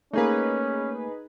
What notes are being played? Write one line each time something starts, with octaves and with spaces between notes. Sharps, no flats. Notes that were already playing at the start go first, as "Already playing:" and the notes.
A3 A#3 C#4 D#4 G#4 B4